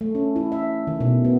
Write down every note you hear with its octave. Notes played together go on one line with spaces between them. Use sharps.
A3
C#4
E4
E5
D#3
B2
B3